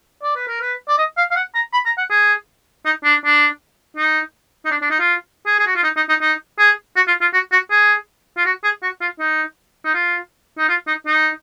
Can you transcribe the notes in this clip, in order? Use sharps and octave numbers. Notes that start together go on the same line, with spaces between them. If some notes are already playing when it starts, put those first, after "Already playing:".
D5
B4
A#4
B4
D5
D#5
F5
F5
F#5
A#5
B5
A#5
F#5
G#4
D#4
D4
D4
D#4
D#4
D4
D4
D#4
F4
G#4
G#4
F#4
F4
D#4
D#4
D#4
D#4
G#4
F#4
F4
F4
F#4
F#4
G#4
F4
F#4
G#4
F#4
F4
D#4
D#4
F4
D#4
F4
D#4
D#4